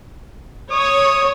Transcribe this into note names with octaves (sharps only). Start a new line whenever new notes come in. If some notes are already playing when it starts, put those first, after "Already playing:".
C#5 D#6